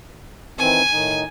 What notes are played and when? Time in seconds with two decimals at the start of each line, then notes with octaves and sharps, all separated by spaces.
0.59 D#3 E3 C4 G#5
0.92 A2 D#3 D#4